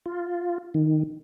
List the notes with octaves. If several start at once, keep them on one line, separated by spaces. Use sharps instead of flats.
F4
D#3